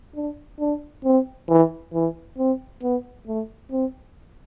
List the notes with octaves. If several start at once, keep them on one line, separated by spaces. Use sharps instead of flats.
D4
D4
C4
E3
E3
C4
B3
A3
C4